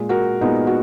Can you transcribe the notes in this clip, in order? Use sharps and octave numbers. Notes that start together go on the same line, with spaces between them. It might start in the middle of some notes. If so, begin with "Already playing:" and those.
Already playing: A#2 G#3
F#4 A#4
A#2 G#3 B3 D#4
F#4